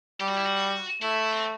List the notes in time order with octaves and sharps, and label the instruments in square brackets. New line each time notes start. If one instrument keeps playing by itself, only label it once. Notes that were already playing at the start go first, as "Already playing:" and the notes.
[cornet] G3 [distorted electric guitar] G4
[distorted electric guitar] F#4
E4
F#4
[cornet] A3 [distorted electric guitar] E4
[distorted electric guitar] C4